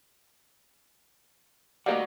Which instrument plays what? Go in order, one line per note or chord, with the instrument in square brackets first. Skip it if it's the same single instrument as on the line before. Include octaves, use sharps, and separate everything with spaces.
[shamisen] G3 A#3 D#4 [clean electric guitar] F#4 D5 F#5